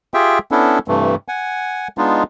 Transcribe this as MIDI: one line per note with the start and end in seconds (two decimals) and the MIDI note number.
0.14 0.39 65
0.14 0.39 67
0.14 0.39 68
0.14 0.39 76
0.14 0.39 79
0.51 0.79 59
0.51 0.79 61
0.51 0.79 62
0.51 0.79 64
0.51 0.79 69
0.88 1.15 43
0.88 1.15 48
0.88 1.15 52
0.88 1.15 57
1.28 1.88 78
1.28 1.88 80
1.98 2.23 56
1.98 2.23 59
1.98 2.23 62
1.98 2.23 63
1.98 2.23 65